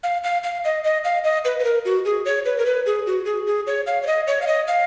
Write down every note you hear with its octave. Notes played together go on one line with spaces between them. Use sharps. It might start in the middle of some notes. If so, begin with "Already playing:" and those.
F5
F5
F5
D#5
D#5
F5
D#5
B4
B4
A#4
F#4
G#4
C#5
B4
A#4
B4
G#4
F#4
G#4
G#4
C#5
F5
C#5
D#5
C#5
F5
D#5
F5